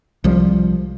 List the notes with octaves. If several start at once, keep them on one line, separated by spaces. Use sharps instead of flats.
C2 F3 G3